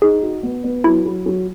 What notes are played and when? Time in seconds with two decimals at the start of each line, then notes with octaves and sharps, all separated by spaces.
0.02 D#4 G#4
0.22 F#4
0.43 B3
0.64 B3
0.84 F#3 E4
1.05 F#3
1.26 F#3